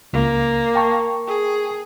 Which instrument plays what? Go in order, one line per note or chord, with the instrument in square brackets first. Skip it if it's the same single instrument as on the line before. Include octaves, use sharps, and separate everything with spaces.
[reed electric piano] C#2 [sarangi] A#3
[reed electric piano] G5 A5 C#6
[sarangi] G#4